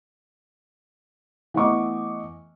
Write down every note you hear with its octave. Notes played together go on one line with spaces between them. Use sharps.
E3 A3 B3 D#5 C#6 D6